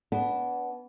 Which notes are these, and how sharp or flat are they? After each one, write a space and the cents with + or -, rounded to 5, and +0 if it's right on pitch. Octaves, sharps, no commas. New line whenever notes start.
B3 +0 D4 -30